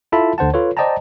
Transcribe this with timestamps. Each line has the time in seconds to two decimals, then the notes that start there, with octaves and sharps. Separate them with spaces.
0.12 E4 F4 A4 E5 A5 B5
0.38 D2 D3 C5 F#5 A5
0.54 F4 A4 B4 C#5
0.77 C5 D5 D#5 G5 A5 A#5